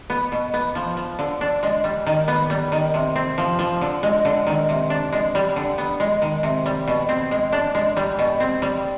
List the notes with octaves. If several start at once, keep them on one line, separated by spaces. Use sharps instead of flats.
B3
B2
B3
F3
F3
D3
D4
G#3
G3
D#3
B3
G3
D#3
C3
C4
F3
F3
D3
G#3
D3
D#3
C3
D4
G#3
G3
D3
B3
G#3
D#3
C3
G3
B2
C4
G#3
D4
G#3
G3
B2
C4
G3